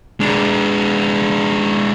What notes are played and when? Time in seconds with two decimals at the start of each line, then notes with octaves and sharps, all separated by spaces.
0.20 G#3 D4